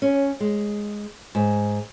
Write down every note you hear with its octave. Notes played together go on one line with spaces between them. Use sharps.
C#4
G#3
G#2